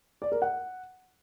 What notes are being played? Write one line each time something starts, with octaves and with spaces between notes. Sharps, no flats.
D5
A#4
F#5